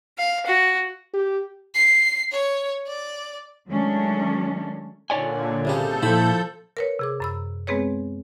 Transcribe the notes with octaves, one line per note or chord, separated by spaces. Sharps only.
F5
F#4
G4
C7
C#5
D5
D#3 F#3 G#3 A3 C#4 D4
A#2 D3 C#5 D5 G#5
C2 C#3 G4 A4 G6
A#2 F3 E4 B5
A#4 B4 C#5
C3 G#4 D6
F#2 B5 E6
G#3 B3 C4 G#4 B4 C#5